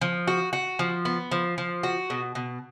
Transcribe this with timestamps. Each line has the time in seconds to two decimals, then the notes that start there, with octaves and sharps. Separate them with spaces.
0.01 F3
0.28 F#4
0.53 F#4
0.79 F3
1.05 B3
1.31 F3
1.58 F3
1.83 F#4
2.10 B2
2.35 B2